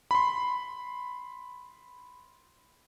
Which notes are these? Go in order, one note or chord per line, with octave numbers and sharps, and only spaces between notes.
B5 C6